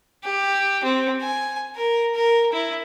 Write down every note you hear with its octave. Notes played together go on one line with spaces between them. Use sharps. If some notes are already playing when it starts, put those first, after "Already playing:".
G4
C4
G#5
A#4
A#4
E4